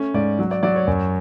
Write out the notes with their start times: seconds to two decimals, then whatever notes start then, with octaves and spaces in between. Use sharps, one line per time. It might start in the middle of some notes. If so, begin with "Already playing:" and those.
Already playing: A3 C#4
0.14 G#2 D5
0.39 F#3
0.51 D5
0.63 F#3 D5
0.76 C#5
0.87 F#2